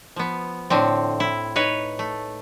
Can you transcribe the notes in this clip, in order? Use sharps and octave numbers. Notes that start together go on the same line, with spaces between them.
F3 B3
A2 D3 C4
E4
D#4 B4 C#5
A3